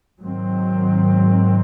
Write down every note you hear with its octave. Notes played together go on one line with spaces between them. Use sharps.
G#2 D#3 F#3 C4